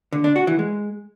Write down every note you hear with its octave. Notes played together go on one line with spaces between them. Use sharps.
D3
D4
F#4
E3
G#3